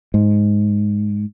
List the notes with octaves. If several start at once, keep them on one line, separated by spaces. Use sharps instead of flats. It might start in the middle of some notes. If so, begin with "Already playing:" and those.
G#2